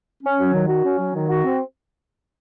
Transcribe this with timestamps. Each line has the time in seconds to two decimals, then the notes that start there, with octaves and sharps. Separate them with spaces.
0.23 C#4
0.38 F#3
0.53 D#3
0.68 F#4
0.83 C#4
0.98 F#3
1.14 D#3
1.29 F#4
1.44 C4